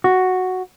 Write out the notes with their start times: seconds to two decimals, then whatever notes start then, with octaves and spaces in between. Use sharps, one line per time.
0.04 F#4